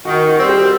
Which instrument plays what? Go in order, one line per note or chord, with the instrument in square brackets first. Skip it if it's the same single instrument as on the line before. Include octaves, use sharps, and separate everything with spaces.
[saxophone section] D#3 [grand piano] F#4
[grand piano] F#4
[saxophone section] G3 C4
[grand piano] G4